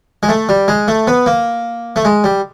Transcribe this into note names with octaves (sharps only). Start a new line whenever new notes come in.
G#3
A3
G3
G#3
A3
B3
A#3
A3
G#3
G3